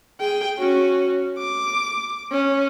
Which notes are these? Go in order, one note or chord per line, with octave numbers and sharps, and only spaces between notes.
G#4 G5
C#4 F#4
D6
C#4